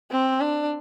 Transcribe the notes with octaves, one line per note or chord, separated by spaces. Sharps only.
C4
D4